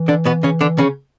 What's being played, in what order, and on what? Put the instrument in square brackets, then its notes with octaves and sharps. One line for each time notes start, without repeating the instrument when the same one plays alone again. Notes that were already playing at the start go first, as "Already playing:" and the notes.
Already playing: [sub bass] E3
[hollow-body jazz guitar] D3 D4
B2 B3
C#3 C#4
D3 D4
C#3 C#4